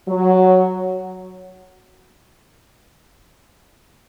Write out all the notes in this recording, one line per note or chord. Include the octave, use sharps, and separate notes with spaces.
F#3